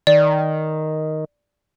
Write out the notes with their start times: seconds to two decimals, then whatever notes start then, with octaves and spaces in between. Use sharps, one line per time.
0.07 D#3 D5